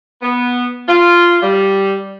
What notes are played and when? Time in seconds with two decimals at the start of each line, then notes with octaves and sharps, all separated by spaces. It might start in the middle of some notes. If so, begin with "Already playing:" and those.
0.22 B3
0.88 F4
1.41 G3